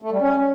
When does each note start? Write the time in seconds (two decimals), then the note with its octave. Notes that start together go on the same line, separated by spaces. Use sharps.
0.02 A3
0.12 G3
0.21 C#4